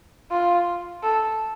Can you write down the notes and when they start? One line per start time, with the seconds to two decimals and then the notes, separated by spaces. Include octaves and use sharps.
0.32 F4
1.04 A4